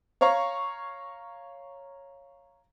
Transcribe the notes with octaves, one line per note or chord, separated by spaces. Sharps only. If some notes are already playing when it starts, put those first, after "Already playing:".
C#5 F5 A#5 C#6